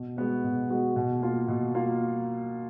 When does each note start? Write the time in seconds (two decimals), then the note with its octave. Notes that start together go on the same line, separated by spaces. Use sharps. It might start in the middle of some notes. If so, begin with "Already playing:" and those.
Already playing: B2
0.17 G#3 B3 F#4
0.44 B2
0.70 G#3 B3 F#4
0.96 B2
1.22 A#3 F4
1.48 B2
1.75 A#3 F4